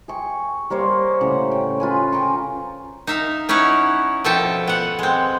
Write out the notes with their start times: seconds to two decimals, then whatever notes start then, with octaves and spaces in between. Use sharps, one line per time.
0.08 G#4 G5 C#6
0.70 G3 A#3 C5 C#5
1.21 A2 C#3 F#5
1.51 G5
1.80 F4 B4 G#5
2.12 G5 G#5 A#5 C#6
3.07 D#4 E5 F5
3.49 C#4 D#4 E4 B4 C#5 F#5
4.24 B2 F3 A4 E5 G5 A5
4.67 B3 F#5
4.99 G#3 C4